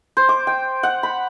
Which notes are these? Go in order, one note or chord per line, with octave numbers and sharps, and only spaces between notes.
C5
D6
G5
F#5
B5